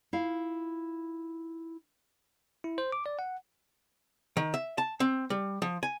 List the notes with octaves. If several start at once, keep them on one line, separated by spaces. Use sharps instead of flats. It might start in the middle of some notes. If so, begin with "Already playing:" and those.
E4 F4 F5
E4
C5
D6
D5
F#5
D#3
E5
A5
C4
G3
F3
G#5